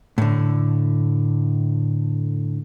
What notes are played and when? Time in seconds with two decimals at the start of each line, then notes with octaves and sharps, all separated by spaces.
0.18 A2 D3